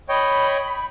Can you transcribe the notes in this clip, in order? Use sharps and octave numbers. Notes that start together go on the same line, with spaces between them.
C#5 D#5 G5 B5